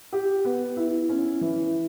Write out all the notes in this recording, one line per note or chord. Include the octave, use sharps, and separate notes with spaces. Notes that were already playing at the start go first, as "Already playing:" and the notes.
G4
B3
E4
C#4
E3